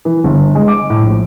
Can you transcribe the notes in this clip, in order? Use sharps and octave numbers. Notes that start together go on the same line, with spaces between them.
E3
G1
G#3
D6
A2
A#1